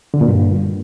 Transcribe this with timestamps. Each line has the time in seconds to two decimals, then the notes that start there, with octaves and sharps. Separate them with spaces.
0.14 D3
0.21 A#2
0.28 G2